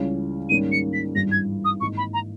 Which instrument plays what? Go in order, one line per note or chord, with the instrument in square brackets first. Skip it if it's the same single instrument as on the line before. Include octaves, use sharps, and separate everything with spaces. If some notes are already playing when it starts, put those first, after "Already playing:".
Already playing: [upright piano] C#2 C#3 E3 G3 C#4
[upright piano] G#2 D#3 G3 A#3 C#4 [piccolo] D#7
[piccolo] C#7
B6
[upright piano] G#1 G2 E3 G3 [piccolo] A#6
[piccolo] G#6
D#6
[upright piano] G#1 G#2 E3 A#3 D#4 [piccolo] C#6
[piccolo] B5
A#5